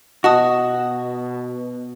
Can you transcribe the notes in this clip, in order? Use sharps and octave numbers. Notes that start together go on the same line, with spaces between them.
B2 F#4 D#5 A5 D#6